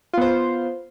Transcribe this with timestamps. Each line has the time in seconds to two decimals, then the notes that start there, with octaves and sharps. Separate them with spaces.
0.14 F4
0.17 B3
0.21 C5